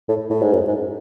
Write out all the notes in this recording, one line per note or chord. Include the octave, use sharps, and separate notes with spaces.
A2
A2
G#2
F#2
G#2